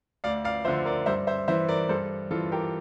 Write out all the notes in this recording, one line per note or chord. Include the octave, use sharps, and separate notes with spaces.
D2 D5 F5
D5 F5
D3 F3 C5 E5
A#4 D5
G2 C5 E5
C5 E5
E3 C5 E5
A#4 D5
G2 A4 C5
E3 F4 A4
G4 A#4